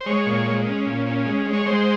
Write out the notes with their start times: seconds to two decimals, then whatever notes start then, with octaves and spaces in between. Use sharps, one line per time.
0.01 C5
0.06 G#3 C#5
0.26 A#2
0.46 G#3
0.66 C#4
0.86 A#2
1.06 C#4
1.26 G#3
1.46 G#3
1.53 C#5
1.66 G#3 C5